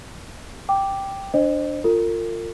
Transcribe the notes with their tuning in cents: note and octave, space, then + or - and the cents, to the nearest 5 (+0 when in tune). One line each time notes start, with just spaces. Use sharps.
G5 +0 D6 +0
D4 +0 C5 +10 D#5 -30
F4 +5 A#4 -45